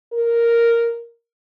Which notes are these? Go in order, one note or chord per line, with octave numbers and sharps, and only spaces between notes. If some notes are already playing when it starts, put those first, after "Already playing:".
A#4